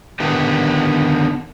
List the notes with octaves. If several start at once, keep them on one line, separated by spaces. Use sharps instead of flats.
D3 D#3 B3 G4